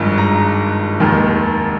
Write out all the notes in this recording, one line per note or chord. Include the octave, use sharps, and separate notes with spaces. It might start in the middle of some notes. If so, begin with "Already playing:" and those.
Already playing: G#1 G2 F3 G#3
A#5
F1 D#2 D#3 G#3